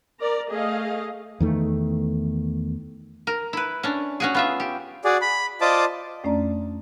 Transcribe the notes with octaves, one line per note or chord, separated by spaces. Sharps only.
A#4 D5 A#5
A3 G#4 D#5 F5
E2 D#3 A3
A#4
E4 B4
C#4 D4
C#4 F#4 G#4
B3 F4 E5
G4
F#4 G#4 D5
B5
F4 C5 D5 D#5 A5 D6
F2 A3 C#4 D4 D5 A#5